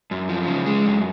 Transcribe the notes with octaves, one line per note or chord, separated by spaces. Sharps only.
F#2
F3
C#3
G#3
F#2